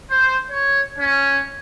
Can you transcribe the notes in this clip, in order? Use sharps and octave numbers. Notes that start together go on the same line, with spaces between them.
C5
C#5
C#4